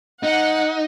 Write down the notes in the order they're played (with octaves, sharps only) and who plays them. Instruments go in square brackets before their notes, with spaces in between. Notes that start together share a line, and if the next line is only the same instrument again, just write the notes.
[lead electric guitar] D#4 [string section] F#5